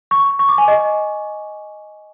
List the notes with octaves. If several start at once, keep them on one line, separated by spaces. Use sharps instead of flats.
C#6
C#6
D6
G#5
D#5